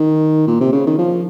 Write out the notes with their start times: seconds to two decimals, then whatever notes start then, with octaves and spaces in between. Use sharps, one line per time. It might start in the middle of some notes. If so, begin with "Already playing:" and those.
Already playing: D#3
0.47 A#2
0.61 C3
0.72 C#3
0.87 D#3
0.99 F3